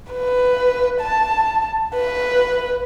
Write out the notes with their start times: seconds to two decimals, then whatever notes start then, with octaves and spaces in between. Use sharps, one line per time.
0.12 B4
1.01 A5
1.95 B4